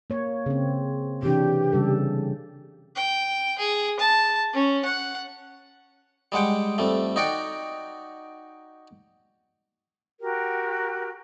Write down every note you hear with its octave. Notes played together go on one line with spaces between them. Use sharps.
A#3 C#5
C#3 C4
C3 E3 D4 G4
C#3 G3 A4
G5
G#4
A5
C#4
F#5
G3 G#3 F#5 G5
F2 G3 A3
D#4 F#4 D5 F#5 G5
F#4 G4 A#4 G5